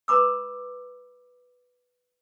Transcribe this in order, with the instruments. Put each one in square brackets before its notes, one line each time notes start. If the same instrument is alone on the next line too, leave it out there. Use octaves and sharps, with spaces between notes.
[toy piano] B4 A#5 B5 D6 E6